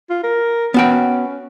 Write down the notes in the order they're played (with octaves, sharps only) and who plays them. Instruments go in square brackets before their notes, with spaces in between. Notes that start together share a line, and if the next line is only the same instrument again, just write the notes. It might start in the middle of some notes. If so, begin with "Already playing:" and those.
[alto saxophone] F4
A#4
[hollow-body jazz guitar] B3 F#4 G5 [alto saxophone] C#4